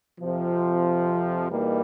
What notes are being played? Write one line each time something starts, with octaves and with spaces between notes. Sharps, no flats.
F2 C3 F3
E2 B2 G3 A#3 D#4